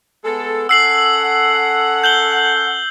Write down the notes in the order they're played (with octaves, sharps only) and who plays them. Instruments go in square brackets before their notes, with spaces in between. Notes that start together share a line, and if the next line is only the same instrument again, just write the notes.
[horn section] G#3 B3 A4
[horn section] C#4 A4 F#5 [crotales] E6 C7 F#7
[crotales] G6 F#7 G7